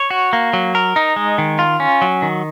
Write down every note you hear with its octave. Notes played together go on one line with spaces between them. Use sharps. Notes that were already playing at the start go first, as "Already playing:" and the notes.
Already playing: C#5
F#4
A#3
F#3
A#4
D#4
G#3
D#3
F4
C#4
F#3
D#3